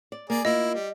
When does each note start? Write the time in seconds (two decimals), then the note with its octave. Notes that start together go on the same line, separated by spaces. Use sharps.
0.12 D5
0.30 A#3 G#4 D5
0.45 A#3 E4 F4 D#5
0.75 G3